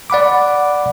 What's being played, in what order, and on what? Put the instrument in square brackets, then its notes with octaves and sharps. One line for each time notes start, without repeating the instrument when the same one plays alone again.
[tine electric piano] D5 F#5 B5 D6